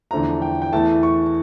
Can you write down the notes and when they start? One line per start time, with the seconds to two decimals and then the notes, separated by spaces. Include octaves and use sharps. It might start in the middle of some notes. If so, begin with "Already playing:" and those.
0.11 E2 D3 F3 A3 A#5
0.42 G5
0.62 G5
0.72 E2 E3 A3 A5
1.03 C#6